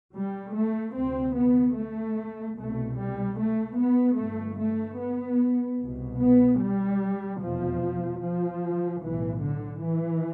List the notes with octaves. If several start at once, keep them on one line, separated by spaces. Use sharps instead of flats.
G3
A3
D2 C3 C4
B3
A3
C2 B2 A3
G3
A3
B3
G1 G2 A3
A3
B3
C2 B2
B3
G3
F1 E2 B2 F3
F3
B1 A2 E3
D3
E3